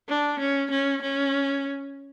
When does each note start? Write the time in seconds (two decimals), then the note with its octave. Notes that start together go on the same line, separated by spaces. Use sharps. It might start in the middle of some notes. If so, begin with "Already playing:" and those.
0.08 D4
0.39 C#4
0.71 C#4
1.02 C#4